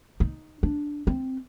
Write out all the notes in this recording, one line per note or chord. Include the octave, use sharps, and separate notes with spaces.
D#4
D4
C4